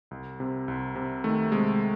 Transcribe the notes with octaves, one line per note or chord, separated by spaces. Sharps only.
C2
C3
C2
C3
D#3 A3
C3 G#3